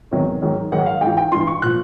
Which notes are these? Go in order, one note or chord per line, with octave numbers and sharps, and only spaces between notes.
E2 C3 D#3 F#3
G#2 D#3 F#3
G#2 D#3 F#3 F#5
F5
G#2 G5
E3
G5
G2 E3 C6
C#6
A#2 F3 F#6